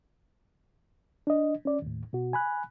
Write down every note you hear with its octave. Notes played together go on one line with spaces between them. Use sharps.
D4 D#5
C#4 D5
D#2 A2
B2 F#4
G#5 B5 F#6